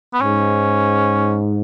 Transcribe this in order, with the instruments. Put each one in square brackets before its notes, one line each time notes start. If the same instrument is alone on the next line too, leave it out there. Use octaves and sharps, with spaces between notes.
[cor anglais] B3
[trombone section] G#2 [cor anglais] C#4